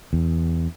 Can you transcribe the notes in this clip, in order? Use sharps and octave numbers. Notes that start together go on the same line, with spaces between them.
E2